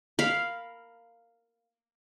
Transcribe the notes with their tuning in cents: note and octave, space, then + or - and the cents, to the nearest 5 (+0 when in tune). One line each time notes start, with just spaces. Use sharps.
A#4 -10 F5 +0 B5 +0